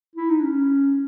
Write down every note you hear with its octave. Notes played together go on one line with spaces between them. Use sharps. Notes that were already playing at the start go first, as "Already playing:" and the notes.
E4
D#4
D4
C#4